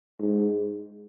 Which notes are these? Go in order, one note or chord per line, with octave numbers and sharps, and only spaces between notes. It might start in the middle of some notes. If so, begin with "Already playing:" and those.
G#2